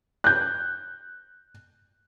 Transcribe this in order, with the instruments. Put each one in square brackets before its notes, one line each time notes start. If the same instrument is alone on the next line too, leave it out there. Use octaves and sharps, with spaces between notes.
[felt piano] F#6 G6